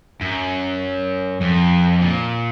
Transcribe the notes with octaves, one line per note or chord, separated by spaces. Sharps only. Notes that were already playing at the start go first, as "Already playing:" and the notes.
F#2
F2
A#2